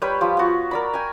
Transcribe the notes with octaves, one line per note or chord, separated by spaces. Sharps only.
G3 B4 C#5 G5
F3 F4 G4
B3 F#4
A#4 D5 B5
G5 G#5